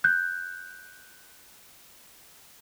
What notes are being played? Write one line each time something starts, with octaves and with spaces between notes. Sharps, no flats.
F#6 G6